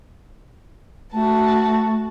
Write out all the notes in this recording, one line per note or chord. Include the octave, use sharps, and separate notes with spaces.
A3 F#4 A5